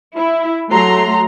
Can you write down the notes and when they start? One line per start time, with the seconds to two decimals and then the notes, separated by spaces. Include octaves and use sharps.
0.16 E4
0.70 F#3 A3 A#5 C6